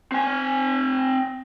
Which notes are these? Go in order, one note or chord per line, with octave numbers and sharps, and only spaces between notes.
C4 G#5